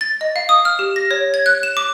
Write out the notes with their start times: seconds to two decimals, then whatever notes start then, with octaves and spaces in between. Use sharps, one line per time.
0.01 A6
0.21 D#5
0.36 F5
0.49 D#6
0.65 F6
0.79 G4
0.96 A#6
1.11 C#5
1.34 G#6
1.46 F#6
1.63 E7
1.77 D6